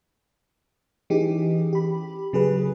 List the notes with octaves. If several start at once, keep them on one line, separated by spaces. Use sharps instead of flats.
E3 C#4 D#4 G4 G#4
G4 B5
C#3 F#3 G#4 A4 B4